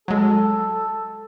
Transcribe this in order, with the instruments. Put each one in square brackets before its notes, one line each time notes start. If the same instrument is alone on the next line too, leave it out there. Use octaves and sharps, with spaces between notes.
[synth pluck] F#3 G#3 [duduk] A4